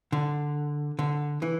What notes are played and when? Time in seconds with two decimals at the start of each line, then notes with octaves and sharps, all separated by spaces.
0.12 D3
0.99 D3
1.42 E3